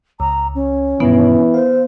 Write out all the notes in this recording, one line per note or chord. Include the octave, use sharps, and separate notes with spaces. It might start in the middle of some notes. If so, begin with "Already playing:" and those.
C#2 A#5
C#4
G2 B2 D#3 E3 B3
C5 F5